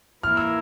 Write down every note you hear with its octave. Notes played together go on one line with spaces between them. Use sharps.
E3 A#3 E4 A#4 F6
E6